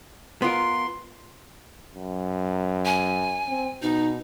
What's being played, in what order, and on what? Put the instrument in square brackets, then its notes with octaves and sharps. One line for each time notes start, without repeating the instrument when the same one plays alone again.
[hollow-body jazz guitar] B3 F4 A#4 [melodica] C6
[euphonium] F#2
[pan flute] G#5
[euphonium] C4
[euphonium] B2 [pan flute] D#4